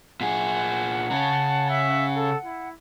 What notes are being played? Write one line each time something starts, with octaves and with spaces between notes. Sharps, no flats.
A#2 G#4 F#5
C#3 C#4 A5
E5
A4
E4